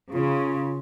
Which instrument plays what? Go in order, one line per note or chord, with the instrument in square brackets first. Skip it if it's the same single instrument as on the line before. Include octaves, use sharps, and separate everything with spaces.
[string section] C#3 [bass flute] F4